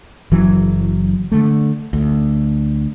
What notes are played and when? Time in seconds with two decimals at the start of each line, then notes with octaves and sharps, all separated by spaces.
0.31 F#1 E3 F#3
1.32 D3 A3
1.93 D2